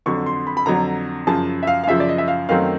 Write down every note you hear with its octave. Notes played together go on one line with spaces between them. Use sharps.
F2 D3 F#3 C#6
C6
B5
B5
F2 D3 F#3 A#5
F#2 C#3 F3 A5
E5
F5
F5
F#2 C#3 F3 E5
D5
D#5
E5
F5
F#2 D#3 F#3 A3 C4 F5